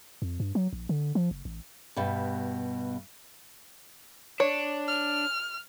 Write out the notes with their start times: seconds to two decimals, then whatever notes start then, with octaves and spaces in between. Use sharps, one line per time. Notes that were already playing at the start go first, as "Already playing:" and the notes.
0.22 F2
0.40 G2
0.55 F#3
0.73 A#1
0.89 D3
1.15 F3
1.31 F#1
1.45 A1
1.96 G2 B2
4.40 D4 C#5
4.88 F6